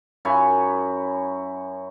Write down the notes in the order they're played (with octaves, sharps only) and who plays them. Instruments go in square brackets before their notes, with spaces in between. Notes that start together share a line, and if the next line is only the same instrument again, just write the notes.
[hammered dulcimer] F#2 E4 C#5 G#5